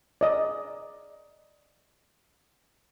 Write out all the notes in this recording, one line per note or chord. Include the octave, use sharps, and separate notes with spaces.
D5 D#5